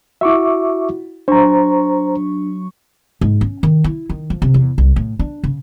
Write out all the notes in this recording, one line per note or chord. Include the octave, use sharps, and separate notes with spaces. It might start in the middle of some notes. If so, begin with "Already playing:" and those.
E4 F#4 E5 C#6 D6
F#3 D4 C5 A#5 C#6
G#2
C#4
D#3
E4
D#3
F3
C3
E2
C2
A2
D4
C#3